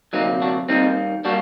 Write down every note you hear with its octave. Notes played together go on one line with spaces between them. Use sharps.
D2 C3 F#3 A#3 C4 D#4
D4 F#4
D#2 D#3 G3 A#3 C4 D#4
G3 A#3 D4 F#4